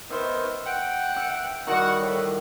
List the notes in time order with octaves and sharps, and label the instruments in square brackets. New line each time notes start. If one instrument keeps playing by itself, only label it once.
[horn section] D#3 B3 C5 [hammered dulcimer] E5
[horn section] F#5 G5
[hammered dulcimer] E5
[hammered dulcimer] D#3 G3 [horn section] F#4 F#5
[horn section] A2